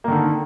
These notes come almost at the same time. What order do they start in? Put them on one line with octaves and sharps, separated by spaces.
A#3 D#3 D3